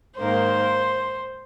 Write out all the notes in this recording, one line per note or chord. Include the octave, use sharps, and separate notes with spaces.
G#2 D#3 A#3 C5